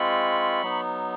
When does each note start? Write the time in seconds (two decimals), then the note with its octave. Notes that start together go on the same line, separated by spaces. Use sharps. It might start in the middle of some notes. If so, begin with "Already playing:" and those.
Already playing: G#3 C4 F4 B5 C#6
0.63 F#3 B3 D#4